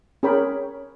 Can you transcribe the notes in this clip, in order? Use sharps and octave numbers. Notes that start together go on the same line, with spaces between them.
C#4 G#4 A#4 C#5 G5 B5